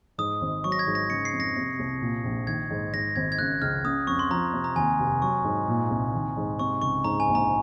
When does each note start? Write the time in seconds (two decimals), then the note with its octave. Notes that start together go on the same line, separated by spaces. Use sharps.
0.18 G#2 D#6
0.41 G#1
0.64 F#3 C#6
0.72 A#6
0.79 G#6
0.87 G#2
0.95 A#6
1.10 C#3 C#7
1.25 C7
1.33 F2
1.40 A#6
1.56 C3
1.79 C2
2.01 A#2
2.24 A#1
2.47 D#3 G#6
2.70 G#2
2.93 G#2 A#6
3.16 G#1 G#6
3.32 G#6
3.39 C#3 F#6
3.62 C#2 F6
3.84 C#3 D#6
4.07 F2 C#6
4.19 C6
4.30 F3 A#5
4.53 C3
4.64 A#5
4.76 D#2 G#5
5.00 F1
5.22 F#3 C#6
5.44 G#2
5.68 A#2
5.90 C2
6.14 D#3
6.37 G#2
6.59 C3 C#6
6.81 C#2 C#6
7.04 G#2 A#5
7.20 G#5
7.28 A#1
7.35 A#5